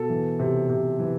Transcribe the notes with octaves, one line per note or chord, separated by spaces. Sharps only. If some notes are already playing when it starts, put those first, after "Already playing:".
Already playing: B2 A4
E3
C3
C3
E3